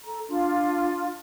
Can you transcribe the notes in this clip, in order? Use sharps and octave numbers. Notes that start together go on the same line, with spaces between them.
A4 A#5
D4 F4